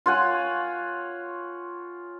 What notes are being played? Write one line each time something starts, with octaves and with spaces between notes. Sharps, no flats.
F4 C#5 F#5 G#5